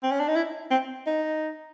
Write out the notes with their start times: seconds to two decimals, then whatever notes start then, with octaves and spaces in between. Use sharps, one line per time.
0.03 C4
0.12 C#4
0.20 D4
0.28 D#4
0.36 E4
0.71 C4
1.07 D#4